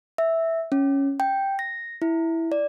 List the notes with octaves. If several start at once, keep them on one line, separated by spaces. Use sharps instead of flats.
E5
C#4
G5
A#6
E4
D5